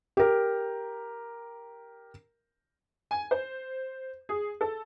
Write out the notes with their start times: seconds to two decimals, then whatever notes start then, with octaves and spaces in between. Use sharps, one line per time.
0.17 G4 A#4
3.11 G#5
3.31 C5
4.29 G#4
4.61 A4